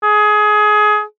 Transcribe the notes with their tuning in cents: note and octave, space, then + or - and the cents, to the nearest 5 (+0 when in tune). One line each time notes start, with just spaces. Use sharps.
G#4 +20